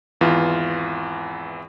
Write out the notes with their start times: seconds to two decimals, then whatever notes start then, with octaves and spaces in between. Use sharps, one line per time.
0.21 G#1 E2 E3 F4